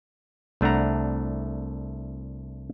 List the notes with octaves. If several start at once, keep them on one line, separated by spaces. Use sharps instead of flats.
C2 A3 D4 F#5 A#5